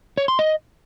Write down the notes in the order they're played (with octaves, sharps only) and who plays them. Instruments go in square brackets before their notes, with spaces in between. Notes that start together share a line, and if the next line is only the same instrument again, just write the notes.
[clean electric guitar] C#5
C6
D#5